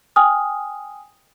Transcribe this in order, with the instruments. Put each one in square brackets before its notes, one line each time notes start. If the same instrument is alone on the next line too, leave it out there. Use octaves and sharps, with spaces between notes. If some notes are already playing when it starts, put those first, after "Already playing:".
[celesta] G5 G#5 D#6 F6